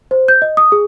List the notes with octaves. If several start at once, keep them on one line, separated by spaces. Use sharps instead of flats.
C5
G6
D#5
D#6
G#4